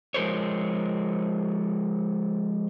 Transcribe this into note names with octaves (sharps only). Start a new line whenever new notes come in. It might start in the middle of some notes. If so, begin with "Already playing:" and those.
F3 G#3 A#4 C5 C#5